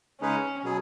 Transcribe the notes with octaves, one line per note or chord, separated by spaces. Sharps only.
C#3 G#3 C#4 D#4 G#4 B4
B2 F#3 B3 G#4